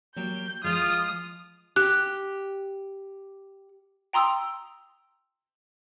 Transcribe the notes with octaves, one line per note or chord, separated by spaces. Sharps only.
F#3 A#3 G4 G6
F3 G#3 F4 D#6
G4 F#6
G5 A#5 C6 D#6 E6